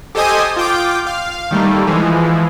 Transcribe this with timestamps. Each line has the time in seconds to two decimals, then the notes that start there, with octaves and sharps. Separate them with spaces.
0.15 G4 A4 C5 D#5 G#5 D#6
0.57 F4 G5 D6
1.07 F5
1.51 D#3 G3 A3 A#3
1.87 E3 F3 G#3